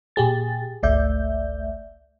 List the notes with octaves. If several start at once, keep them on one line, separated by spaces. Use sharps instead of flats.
A#2 G4 G#4 A6
G1 C#2 A3 D5 E5 G6